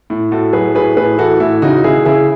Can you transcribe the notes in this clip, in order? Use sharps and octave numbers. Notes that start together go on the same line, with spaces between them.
A2
A2 F#4 A4
F#3 G#4 B4
A2 G#4 B4
A2 G#4 B4
E3 F#4 A4
A2 E4
C#3 D#4 F#4
C#3 E4 G#4
C#3 E4 G#4